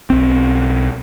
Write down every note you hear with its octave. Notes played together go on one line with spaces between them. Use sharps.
B1 C4